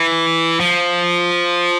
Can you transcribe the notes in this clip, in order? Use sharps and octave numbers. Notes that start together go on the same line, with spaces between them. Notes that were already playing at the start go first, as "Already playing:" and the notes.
Already playing: E3
F3